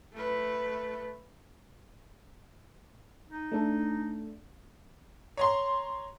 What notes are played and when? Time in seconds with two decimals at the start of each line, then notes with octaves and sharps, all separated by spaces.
0.13 A3 B4
3.30 D#4
3.52 A3 D4 A4
5.37 C#5 A#5 C6